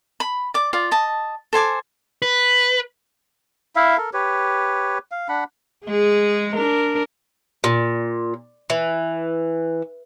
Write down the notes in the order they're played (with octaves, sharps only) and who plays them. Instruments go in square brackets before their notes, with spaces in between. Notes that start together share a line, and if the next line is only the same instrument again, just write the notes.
[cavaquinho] B5
D5 D6
F4 D5
D#5 A5
A4 C5 G#5 D6
[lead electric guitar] B4
[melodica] E4 E5 F5
A4 A#4
G4 B4 C#5
F5
D4 F#5 B5
[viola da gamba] G#3 G#4
D4 A#4
[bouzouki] A#2
E3